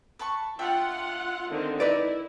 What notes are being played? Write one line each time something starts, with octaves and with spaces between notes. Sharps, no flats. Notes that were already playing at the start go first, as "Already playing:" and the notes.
B4 A5 C#6
D4 F4 E5 F#5 G5
D3 D#3 C4
D#4 E4 B4 D5